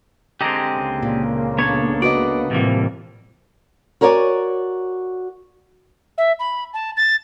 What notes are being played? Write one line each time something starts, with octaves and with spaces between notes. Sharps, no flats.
D3 G#3 C4 G4 D#5 A#5
C#2 C#3 A#3
A#2
B3 D4 A4 C#5
F#4 B4 D5 D#5
A2 C3 E3 F3 G3 A#3
F#4 A#4 C#5 D5 E5 G#5
E5
B5
A5
A6